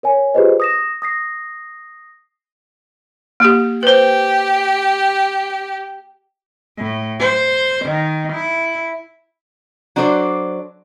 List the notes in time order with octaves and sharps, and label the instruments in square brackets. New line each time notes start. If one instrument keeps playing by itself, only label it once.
[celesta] A#4 C#5 G#5
F4 G4 G#4 B4 C5 D#5
D#6 A#6 E7
D#6 A#6 C7
[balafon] A#3 G4
[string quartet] G4 [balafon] B4 C5
[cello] A2
C5
D#3
E4
[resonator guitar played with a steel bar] F#3 D4 F#4 A4 C5 D5